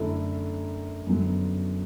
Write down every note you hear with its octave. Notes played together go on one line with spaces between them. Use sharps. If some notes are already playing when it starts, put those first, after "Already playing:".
Already playing: F#2 D3 A3 E4 A4
F#2 D3 F#3 B3